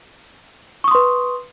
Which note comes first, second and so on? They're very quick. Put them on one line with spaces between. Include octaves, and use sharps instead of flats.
C#6 D#6 C6 B4